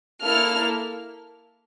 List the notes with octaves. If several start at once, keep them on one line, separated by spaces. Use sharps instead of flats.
A#3 E4 A4 F6